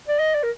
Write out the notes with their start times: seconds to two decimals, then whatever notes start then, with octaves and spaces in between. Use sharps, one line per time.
0.08 D5
0.19 D#5
0.34 D5
0.43 A#4